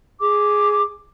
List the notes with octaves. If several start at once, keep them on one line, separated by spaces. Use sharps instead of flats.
G#4 D6